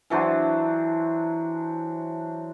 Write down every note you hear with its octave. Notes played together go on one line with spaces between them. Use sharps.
E3 F#3 D4 C5